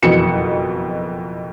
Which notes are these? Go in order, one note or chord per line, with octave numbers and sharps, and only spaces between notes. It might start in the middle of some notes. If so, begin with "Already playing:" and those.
F#1 F2 B2 E3 C#7 E7